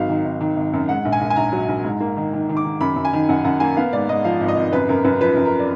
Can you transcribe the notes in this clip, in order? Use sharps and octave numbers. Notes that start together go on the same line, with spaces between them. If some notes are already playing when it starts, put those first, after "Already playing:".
Already playing: G#1 F#3 F5
D#3
G#1
D#3
G#1
F#2
G#2 F#5
A#1
G#5
A#1
G#5
A#1 A#5
F#3
A#1
G#2
A#3
D#3
D#3
D#3
D6
D#3
F#2 B5
F#2
G#5
D#3
F#2 F#5
F#2 F#5
A#3 G#5
B3 F5
G#2 D5
G#2 D#5
F3 F5
G#1
D#5
G#1
F#2 B4
F#2 A#4
F#2 B4
F3 B4
F#2
A#4
D5